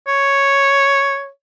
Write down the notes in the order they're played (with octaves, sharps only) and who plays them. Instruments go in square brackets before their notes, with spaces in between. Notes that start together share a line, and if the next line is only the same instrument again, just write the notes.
[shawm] C#5